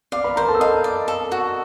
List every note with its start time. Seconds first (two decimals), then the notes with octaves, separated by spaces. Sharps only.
0.12 D5 F5 D6
0.24 B4 B5
0.36 A#4 C5 A#5
0.49 A4 A5
0.55 E6
0.60 D#5 F5 D#6
0.84 D5
1.08 A4
1.32 F#4